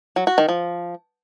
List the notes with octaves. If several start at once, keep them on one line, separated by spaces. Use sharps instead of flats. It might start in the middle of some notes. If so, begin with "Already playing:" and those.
F#3
F#4
D#3
F3